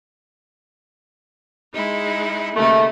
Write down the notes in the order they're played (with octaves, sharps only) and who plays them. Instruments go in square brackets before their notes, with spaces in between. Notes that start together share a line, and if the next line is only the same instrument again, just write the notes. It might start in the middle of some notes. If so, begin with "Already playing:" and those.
[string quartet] G#3 D#4 E4
[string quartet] D#2 C#3 D#4 [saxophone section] A3